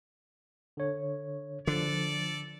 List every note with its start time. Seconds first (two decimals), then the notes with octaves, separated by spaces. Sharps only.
0.77 D3 C#5
1.67 D3 F3 A4 D5